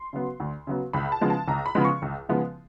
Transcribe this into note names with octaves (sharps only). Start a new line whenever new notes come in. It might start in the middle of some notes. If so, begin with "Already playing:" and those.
Already playing: C6
C#3 F#3 B3
D2
C#3 F#3 B3
C#2 B5
A5
C#3 F3 G#3 B3
A5
C#2 A#5
B5
C#3 F3 G#3 B3
C#6
C#2
C#3 F3 G#3 B3